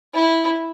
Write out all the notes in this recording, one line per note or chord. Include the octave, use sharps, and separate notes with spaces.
E4